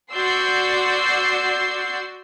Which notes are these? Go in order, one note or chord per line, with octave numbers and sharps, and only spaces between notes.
F#4 D5 C6 E6 G6 C7